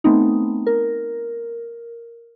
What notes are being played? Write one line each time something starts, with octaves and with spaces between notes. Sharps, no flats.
A3 B3 C4 D#4
A#4